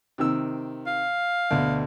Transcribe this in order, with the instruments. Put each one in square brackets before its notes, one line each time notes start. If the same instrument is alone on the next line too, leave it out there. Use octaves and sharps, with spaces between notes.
[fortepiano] C3 D#3 E6
[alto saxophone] F5
[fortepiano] D2 B2